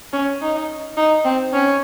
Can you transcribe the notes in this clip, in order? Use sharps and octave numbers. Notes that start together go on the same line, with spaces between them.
C#4
D#4
D#4
C4
C#4